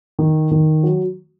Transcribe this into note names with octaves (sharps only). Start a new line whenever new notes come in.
D#3
D#3
F#3